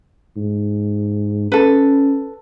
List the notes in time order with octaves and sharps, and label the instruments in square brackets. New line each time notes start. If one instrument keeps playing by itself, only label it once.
[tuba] G#2
[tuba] C#4 [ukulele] A4 B4